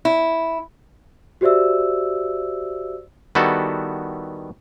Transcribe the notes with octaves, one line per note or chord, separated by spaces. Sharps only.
E4
F#4 G4 C5 D5 E5 E6
D#3 G3 B3 E4 F#4 A4